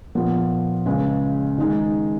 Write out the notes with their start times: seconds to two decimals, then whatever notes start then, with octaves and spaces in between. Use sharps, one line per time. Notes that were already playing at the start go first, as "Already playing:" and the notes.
0.15 A#2 F3 B3 F4
0.86 C#2 C#3 G#3
1.58 D#3 G#3 D#4